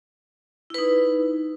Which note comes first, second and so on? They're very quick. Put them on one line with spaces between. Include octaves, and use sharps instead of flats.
E4 B4 D#4